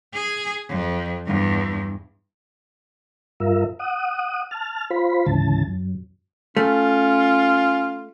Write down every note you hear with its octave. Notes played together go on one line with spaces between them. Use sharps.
G#4
F2
E2 G2
G2 F4 A#4 E5
F#5 D#6
A5 F6
F4 C5 B5
D2 G#2 C#3 E3 A5
F#2
A3 C#4 F4